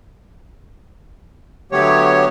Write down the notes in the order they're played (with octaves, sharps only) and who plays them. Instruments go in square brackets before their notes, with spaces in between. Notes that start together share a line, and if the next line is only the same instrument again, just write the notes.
[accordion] D3 F#3 A3 B3 G4 C#5